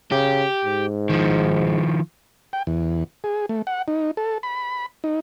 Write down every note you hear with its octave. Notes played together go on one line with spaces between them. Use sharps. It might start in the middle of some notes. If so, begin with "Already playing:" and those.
C#3 G4
G#2
D#3 F3
G5
E2
G#4
A3
F#5
D#4
A4
B5
D#4